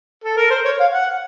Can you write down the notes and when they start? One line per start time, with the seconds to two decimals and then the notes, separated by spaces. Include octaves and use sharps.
0.24 A4
0.37 A#4
0.50 C5
0.65 C#5
0.80 F5
0.94 F#5